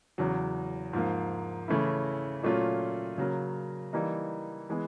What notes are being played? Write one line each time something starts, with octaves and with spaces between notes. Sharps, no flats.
E2 C#3 F#3
G#2 F3 A#3
C#3 E3 A3 C#4 E4
A#2 F#3 A3 C#4 F4
C#3 F#3 A#3
E3 G3 A#3 D#4
E3 G#3 B3